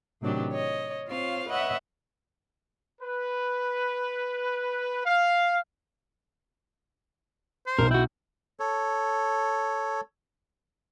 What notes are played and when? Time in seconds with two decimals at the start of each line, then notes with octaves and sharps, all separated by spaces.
0.21 A2 C3 D#3 F#3 D4 G4
0.52 C#5 D#5
1.07 C4 F4 C5 C#5 F5
1.49 B4 C#5 D#5 E5 F#5
3.01 B4
5.06 F5
7.66 C5
7.79 B1 A#4
7.91 E4 F#4 G5
8.60 A4 C#5